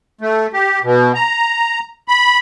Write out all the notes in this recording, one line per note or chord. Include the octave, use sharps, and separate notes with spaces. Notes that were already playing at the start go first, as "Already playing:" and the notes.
A3
G4
B2
A#5
B5